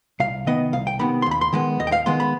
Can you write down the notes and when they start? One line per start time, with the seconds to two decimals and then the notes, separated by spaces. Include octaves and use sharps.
0.20 C2 F5
0.46 C3 D#3 B3 D#5
0.73 C2 F5
0.87 G5
0.99 C3 D#3 B3 B5
1.22 C6
1.26 D#2
1.31 B5
1.41 C6
1.53 D#3 G#3 B3
1.80 D#2 D#5
1.87 G5
1.92 F5
2.06 D#3 G#3 B3 C6
2.20 B5